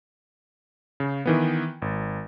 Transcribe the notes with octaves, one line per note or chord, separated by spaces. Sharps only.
C#3
D#3 E3 B3
G#1